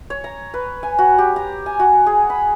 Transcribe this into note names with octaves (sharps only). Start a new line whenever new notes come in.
C#5
A#5
B4
G#5
F#4
G4
A#5
G#5
F#4
G#4
B5